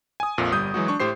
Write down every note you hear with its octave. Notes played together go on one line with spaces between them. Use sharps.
G#5 D#6
A#1 F2 A#2
G1 G3 D#6 G6
E3 F#3 G#3 F#4
D4 C#6
A2 G4 C5 C7